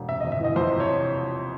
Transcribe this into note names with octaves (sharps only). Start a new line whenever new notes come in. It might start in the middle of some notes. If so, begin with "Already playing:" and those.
Already playing: E1
C3 E5
G1 D#5
E5
E3 D#5
F2 C5
C3
C#5